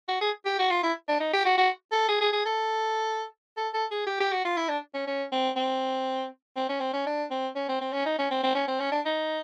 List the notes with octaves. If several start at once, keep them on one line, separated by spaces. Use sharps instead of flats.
F#4
G#4
G4
F#4
F4
E4
D4
D#4
G4
F#4
F#4
A4
G#4
G#4
G#4
A4
A4
A4
G#4
G4
G4
F#4
F4
E4
D4
C#4
C#4
C4
C4
C4
C#4
C4
C#4
D4
C4
C#4
C4
C4
C#4
D#4
C#4
C4
C4
C#4
C4
C#4
D4
D#4